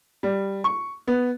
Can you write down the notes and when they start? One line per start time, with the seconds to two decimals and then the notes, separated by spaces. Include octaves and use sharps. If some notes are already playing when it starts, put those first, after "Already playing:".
0.23 G3
0.64 C#6
1.07 B3